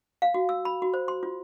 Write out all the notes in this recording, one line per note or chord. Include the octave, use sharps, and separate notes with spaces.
F5
F#4
E6
B5
F#4
C5
C6
F4